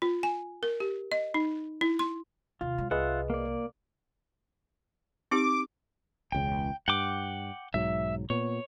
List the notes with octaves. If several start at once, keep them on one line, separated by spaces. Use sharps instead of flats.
F4
G#5
A#4
G4
D#5
D#4
E4
C6
D#2 C3 F4
F#3 G#3
C2 F4 G#4 B4 D#5 E5 F#5
A#3 D5
C4 D#4 G4 D6
E1 C#2 C#3 G5
G2 F#5 G5 D6
B1 G#2 F#3 E5
A#2 B3 C#5